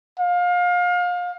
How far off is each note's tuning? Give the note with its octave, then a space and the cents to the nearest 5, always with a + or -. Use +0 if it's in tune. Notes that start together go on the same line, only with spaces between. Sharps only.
F5 +30